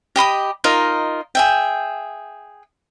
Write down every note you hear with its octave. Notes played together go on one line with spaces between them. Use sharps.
G4 D#5 B5 D#6
D#4 F4 A#4 D#5
G#4 E5 G5